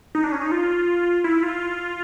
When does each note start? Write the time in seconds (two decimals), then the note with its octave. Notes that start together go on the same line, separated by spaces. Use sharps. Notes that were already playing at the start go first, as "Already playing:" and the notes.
0.15 D#4
0.24 D4
0.32 C#4
0.42 D#4
0.52 F4
1.24 E4
1.43 F4